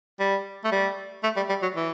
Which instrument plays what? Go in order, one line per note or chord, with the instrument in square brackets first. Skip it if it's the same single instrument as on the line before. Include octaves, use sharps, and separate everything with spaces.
[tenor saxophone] G3
A3
G3
A3
G3
G3
F#3
E3